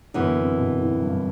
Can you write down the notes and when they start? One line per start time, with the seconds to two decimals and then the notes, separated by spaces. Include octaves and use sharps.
0.14 F#2 D3 E3 B3
0.36 C3
0.57 B2
0.79 A2
1.01 G2